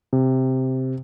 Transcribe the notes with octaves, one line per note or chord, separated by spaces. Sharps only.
C3